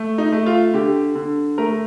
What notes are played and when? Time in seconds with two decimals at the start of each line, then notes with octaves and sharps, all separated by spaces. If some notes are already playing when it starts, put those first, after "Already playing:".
Already playing: A3
0.18 D#4
0.32 A3
0.46 F4
0.74 D3 G4
1.15 D3
1.58 A3 A#4